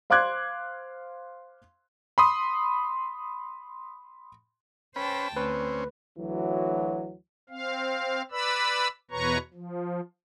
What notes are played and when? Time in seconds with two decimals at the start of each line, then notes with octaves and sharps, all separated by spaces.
0.10 C5 F5 C6 D6 F#6 G#6
2.18 B5 C6 D#6
4.96 C#4 B4 C5 G5 A5 B5
5.36 D2 C4 C#4 B4
6.19 D2 E3 F#3
7.50 C4 F5
8.31 B4 D5 B5 E6
9.11 E2 B2 B4 C#5 A#5 C#6
9.54 F3